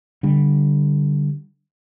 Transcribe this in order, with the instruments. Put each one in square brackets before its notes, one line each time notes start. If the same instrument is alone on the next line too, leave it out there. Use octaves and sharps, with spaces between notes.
[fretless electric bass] D3 G3